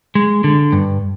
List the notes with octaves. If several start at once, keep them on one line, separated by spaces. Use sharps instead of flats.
G#3
D3
G2